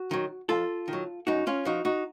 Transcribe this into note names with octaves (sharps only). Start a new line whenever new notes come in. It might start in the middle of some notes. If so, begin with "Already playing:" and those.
Already playing: F#4
D#3 F#3
F2 F4 A4
D#3
F#3
F#2 D#4 F#4
C#4 F4
F3 D#4 F#4
D#4 F#4